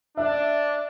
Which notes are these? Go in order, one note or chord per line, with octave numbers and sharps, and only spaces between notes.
D4 E5